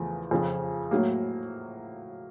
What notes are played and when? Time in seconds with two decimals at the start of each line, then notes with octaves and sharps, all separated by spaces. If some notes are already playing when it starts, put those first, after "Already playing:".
Already playing: E2 C#3 F3 A3
0.31 F2 C#3 F3
0.91 A2 F#3 A#3